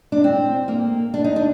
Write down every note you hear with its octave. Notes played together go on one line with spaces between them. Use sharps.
D4
C4
A#3
D4
D#4
D4